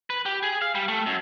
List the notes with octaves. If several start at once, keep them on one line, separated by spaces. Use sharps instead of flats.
B4
G4
G#4
F5
G3
A3
F#2